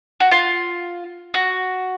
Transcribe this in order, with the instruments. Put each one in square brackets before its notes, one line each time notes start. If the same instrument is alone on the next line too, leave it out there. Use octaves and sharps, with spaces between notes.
[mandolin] F#4
F4
F#4